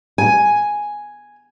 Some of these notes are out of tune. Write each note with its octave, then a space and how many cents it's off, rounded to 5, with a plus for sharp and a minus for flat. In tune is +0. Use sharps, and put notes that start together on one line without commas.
G#5 +0